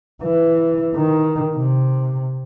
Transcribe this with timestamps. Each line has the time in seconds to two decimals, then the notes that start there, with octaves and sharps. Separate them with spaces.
0.22 E3
0.95 D#3
1.56 C3